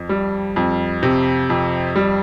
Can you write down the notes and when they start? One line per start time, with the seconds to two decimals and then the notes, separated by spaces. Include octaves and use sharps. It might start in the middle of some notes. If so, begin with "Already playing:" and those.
Already playing: F2
0.09 G3
0.56 F2
1.03 C3
1.50 F2
1.96 G3